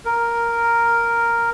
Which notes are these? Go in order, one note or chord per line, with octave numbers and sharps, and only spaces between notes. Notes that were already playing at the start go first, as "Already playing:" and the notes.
A#4